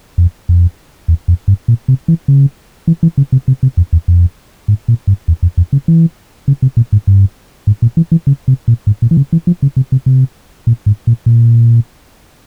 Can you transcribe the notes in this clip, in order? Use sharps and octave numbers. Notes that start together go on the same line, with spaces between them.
F2
F2
E2
F2
G2
A#2
C3
E3
C#3
E3
E3
C#3
C3
C3
C3
F2
E2
F2
G#2
A#2
G2
E2
F2
F2
C#3
E3
C#3
C3
A#2
G#2
G2
G#2
A#2
E3
E3
C#3
C3
A#2
G#2
A#2
E3
C#3
E3
F3
C#3
C3
C3
C3
A#2
G#2
A#2
A#2